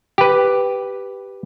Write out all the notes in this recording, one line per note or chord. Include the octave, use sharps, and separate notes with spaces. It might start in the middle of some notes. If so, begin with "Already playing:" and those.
G4 B4